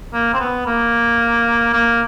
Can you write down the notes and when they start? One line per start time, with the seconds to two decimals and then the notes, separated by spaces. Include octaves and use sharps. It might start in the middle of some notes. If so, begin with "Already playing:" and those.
0.13 A#3
0.33 C4
0.39 B3
0.66 A#3
1.73 A#3